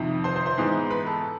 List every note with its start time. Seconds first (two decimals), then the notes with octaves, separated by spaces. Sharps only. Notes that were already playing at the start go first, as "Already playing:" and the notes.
Already playing: F2 C3 D#3
0.24 C5 C6
0.36 C5 C6
0.46 C5 C6
0.58 G#2 E3 G#3 B3
0.90 B4 B5
1.06 A4 A5